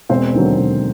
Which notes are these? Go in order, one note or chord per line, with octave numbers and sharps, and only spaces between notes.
E1 C4 C5
D#2 D3 F#3
E1